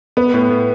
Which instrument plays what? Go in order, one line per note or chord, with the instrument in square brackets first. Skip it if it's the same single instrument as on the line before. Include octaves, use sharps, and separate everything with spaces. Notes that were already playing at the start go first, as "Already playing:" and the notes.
[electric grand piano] B3 [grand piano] B4
[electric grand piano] A2
A2